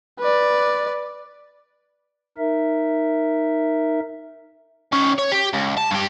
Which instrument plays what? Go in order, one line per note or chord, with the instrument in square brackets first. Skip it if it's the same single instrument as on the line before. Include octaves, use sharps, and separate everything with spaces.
[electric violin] B4 D5
[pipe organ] D#4 A#4 E5
[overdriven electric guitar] D#3 C#4
C#5
G4
C#2
A5
G2 G4